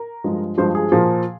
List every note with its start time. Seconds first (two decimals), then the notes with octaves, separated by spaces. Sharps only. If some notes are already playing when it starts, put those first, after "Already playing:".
Already playing: A#4
0.24 G2 F3 G#3
0.58 G2 F3 G#3 C5
0.75 G#4
0.92 A#2 F3 A#3